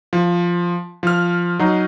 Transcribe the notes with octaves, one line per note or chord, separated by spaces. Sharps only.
F3
F3 F6
F#3 D#4